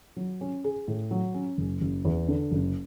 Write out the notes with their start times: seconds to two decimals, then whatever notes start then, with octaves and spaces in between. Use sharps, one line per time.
0.17 F#3
0.41 C#4
0.64 G#4
0.88 A2
1.11 F#3
1.34 C#4
1.58 F#1
1.81 F#1
2.05 E2
2.28 D3
2.51 F#1